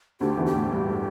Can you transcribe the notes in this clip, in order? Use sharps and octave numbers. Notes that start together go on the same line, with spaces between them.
D2 D3 G4
E2 E3
G4
A2
G2